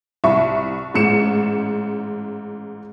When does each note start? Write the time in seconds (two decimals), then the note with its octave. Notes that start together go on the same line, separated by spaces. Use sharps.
0.24 C2 E5 B5 C#6
0.94 A1 G#2 C#7 E7